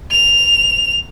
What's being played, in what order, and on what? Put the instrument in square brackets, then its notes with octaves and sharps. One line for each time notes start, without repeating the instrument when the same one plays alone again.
[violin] F7